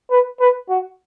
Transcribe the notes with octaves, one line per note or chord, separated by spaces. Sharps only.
B4
B4
F#4